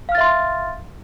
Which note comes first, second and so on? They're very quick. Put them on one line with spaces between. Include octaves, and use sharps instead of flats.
F5 F6 A6 E5 C6